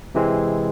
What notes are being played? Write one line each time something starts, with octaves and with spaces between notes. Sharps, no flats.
C3 E3 G#3 C4